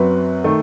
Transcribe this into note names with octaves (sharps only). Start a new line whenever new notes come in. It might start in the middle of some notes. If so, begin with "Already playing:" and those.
Already playing: F#2 F#3 C4 B4
D#3 A3